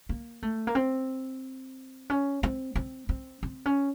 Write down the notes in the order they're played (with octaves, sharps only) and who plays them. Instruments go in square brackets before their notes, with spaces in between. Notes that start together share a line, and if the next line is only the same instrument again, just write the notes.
[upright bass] A#3
A3
A#3
C4
C#4
C4
C4
C4
C4
C#4